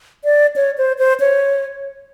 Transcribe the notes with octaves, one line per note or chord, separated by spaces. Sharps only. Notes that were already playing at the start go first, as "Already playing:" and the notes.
D5
C#5
C5
C5
C#5